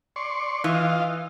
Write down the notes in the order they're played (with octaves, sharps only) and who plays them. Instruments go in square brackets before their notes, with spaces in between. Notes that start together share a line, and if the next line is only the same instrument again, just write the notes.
[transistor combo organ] D5 C6 C#6
[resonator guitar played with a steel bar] E3 [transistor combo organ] F4 D#5 F5